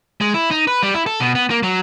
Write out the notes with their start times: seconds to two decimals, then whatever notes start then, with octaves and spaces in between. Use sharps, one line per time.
0.21 G#3
0.34 E4
0.51 D#4
0.67 B4
0.83 G3
0.94 E4
1.06 A4
1.20 B2
1.35 B3
1.50 A#3
1.63 F#3